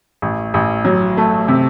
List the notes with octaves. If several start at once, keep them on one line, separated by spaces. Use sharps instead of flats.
A1
A1
F#3
A3
C3